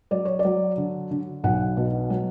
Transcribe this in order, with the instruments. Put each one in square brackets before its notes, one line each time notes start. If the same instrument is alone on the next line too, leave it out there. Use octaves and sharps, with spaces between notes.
[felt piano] F#3 D5
C#5
D5
F#3
D3
D3
B1 F#5
B2
F#3